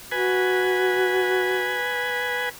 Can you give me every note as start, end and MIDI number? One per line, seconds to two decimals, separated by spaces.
0.12 1.83 66
0.12 2.49 71
0.12 2.49 80